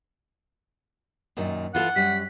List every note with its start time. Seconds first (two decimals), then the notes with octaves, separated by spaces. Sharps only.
1.37 F#2 A#2 D#3
1.75 E3 F4 A4 F#5
1.96 F#2 G3 B6